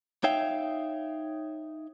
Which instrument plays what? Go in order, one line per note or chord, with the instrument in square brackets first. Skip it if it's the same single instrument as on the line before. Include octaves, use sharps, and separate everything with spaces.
[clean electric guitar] D#4 C#5 E5 F5 G5